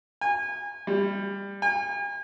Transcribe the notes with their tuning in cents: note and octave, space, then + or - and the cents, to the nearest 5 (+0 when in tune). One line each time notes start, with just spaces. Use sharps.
G#5 -30
G3 +20
G#5 -45